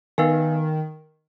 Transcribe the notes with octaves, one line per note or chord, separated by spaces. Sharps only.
D#3 B3 D#4 B4 F5 G#5